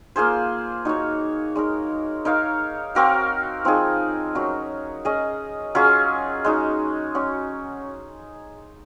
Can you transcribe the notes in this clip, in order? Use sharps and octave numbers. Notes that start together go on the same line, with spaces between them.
A#3 F4 G#4 C5
D#4 F#4 C#5
G#3 D#4 A#4
D#4 A#4 C#5 F5
C4 F#4 A#4 F5
F3 C4 D#4 G#4
F#3 C#4 F#4 A#4
C#4 G#4 D#5
F#3 C#4 F4 G#4
G#3 D#4 F#4
F#3 C#4 F#4